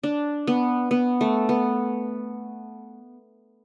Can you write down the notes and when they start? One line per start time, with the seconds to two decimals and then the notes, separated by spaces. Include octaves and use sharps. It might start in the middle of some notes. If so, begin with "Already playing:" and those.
0.03 D4
0.47 B3
0.91 B3
1.21 A3
1.49 B3